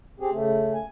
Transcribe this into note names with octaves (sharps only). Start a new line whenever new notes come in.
C4 G4 G#4
C#3 A3
G#5